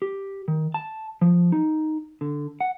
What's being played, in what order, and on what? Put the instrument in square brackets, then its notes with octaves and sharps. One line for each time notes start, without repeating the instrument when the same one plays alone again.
[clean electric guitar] G4
D#3
A5
F3
D#4
D3
F#5